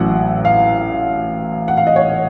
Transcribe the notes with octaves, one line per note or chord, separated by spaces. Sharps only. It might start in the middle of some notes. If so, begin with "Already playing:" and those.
Already playing: A1 A2 F#3 F#5
F5
F#5
F5
D#5
C#5